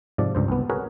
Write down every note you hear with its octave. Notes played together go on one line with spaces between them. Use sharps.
G#2 C3 F3 D5
C#2 G2 C5
C2 B3
F#4 G#4 A#4 B4 C#5